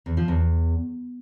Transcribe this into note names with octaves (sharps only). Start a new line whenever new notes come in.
E2
F3
E2